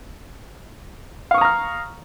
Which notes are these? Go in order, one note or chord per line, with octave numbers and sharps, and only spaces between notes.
F5 A#5 C#6 D#6 F6